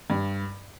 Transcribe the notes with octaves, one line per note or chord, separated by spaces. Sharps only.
G2